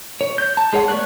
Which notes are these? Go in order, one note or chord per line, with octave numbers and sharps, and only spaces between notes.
C#5
G6
A5
G#3 G#4 C#5 F#5
A3 B3 C#5 D5 F#6